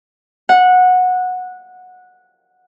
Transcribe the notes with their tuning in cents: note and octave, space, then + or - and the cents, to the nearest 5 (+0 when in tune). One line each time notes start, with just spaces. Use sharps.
F#5 -15